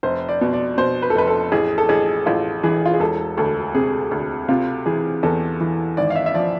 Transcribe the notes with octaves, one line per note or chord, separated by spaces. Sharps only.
F1 C5
D5
B2
D5
B2 C5
B4
A4
F1 B4
A4
A1 G#4
A4
A1 G#4
A1 F4
E3 G#4
F4
G#4
E1 A4
D2 A4
C3 G#4
D2
C3 F4
E3 G#4
E2 A4
E3
G#1 D5
F5
E5
E5
F3 D5